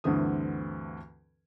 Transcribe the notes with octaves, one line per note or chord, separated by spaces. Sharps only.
D2 G2 D3 E3 C4 D#6